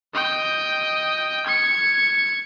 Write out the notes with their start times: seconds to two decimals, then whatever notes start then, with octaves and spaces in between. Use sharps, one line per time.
0.14 D#5 G5
1.46 G#6 C#7